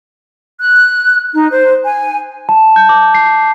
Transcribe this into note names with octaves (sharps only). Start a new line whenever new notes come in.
F#6
D#4
C5
G#5
A5
G6
D6
C7